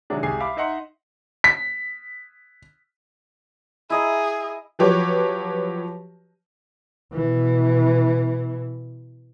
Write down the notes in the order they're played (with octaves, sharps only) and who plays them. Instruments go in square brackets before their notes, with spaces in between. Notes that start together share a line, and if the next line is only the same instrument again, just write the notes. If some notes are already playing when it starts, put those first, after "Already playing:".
[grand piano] C3 D#3 F#3 G#3 D4
C2 G#3 G4 G#5 C7
E5 F5 B5 D6
D#4 D#5 E5 F#5 A#5 C6
[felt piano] B6
[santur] E4 D#5 A#5 [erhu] G#4
[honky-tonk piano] F3 F#3 G4 B4 C#5
[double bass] B2 E3